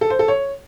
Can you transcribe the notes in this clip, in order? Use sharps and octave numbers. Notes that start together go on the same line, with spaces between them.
A4
C5
A4
C#5